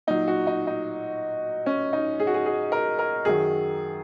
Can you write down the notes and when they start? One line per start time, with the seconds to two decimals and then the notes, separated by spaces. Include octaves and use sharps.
0.07 A#2 F#3 D#4
0.28 F#4
0.47 D#4
0.67 D#4
1.66 C#4
1.93 D#4
2.20 G#4
2.27 F#4
2.34 G#4
2.46 G#4
2.72 A#4
2.99 A#4
3.25 F#2 D#3 F#3 G#4